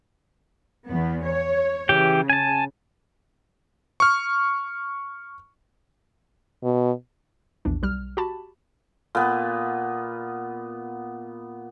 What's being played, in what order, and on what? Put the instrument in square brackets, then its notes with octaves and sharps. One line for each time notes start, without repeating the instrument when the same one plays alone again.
[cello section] E2 B3
C#5
[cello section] C#3 [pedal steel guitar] E3 G4 G5
[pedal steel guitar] G#5 A5
[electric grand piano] C#6 F6
[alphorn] B2
[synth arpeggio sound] A#1 E2 D4
B1 G3 F6
F#4 G4 A5 B5
[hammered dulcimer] A#2 B3